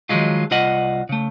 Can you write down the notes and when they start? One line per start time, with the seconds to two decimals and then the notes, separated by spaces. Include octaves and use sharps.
0.09 D#3 F3 F#3 G#3 F4
0.51 C2 F4 D#5 F#5
1.09 C#3 A3